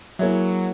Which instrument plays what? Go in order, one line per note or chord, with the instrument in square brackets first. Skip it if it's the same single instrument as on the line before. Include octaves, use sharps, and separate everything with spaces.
[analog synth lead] F#3 [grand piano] A#3 E4 G#4 C#5 E5